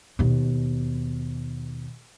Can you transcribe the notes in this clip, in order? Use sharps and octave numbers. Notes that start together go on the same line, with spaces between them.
D#2 B2